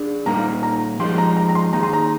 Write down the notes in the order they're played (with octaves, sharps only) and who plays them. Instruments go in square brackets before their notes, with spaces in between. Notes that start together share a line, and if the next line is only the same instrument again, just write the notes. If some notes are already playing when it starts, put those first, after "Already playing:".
Already playing: [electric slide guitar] D4 G#4 D5
[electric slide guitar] A#2 G3 A#3 D#4 [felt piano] A#5
[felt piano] A#5
[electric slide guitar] F3 G#3 D#4 G4 [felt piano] C6
[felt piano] A#5
A#5
A#5
C6
[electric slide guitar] D#3 A#3 D#4 G#4 [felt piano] A#5
[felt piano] C6
A#5